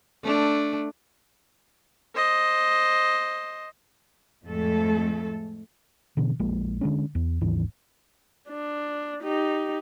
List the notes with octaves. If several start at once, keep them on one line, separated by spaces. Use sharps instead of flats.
A3 D4
C5 D#5
F2 A2 G#3 A3 A4
B2 D3 E3
A#1 F3 G#3 A#3
D3 G#3 C#4
E2
G#1 D#2 G#2 E3
D4
D#4 G4